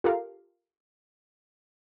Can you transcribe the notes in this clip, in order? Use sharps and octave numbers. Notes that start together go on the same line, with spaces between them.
F4 G4 A4 A#4 F5